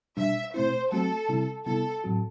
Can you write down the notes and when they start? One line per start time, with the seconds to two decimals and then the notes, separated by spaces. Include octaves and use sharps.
0.17 B2 G3 D4 E5
0.54 B2 A3 C4 E4 C5
0.91 F#3 A3 C4 F#4 A4
1.29 C3 G3 C4 E4
1.66 C3 G3 B3 E4 A4
2.04 A2 F#3 C4 F#4